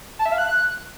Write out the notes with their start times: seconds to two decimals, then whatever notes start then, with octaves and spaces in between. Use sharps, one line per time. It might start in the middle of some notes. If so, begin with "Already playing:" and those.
0.19 A5
0.26 E5
0.32 F5
0.38 F#6